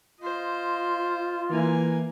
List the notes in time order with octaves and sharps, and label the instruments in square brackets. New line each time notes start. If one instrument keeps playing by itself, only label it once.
[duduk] F4 [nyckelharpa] C5 D#5
[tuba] E3 [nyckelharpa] A#3 G#5